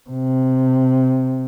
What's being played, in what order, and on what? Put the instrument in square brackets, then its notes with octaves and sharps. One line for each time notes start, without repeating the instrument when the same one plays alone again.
[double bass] C3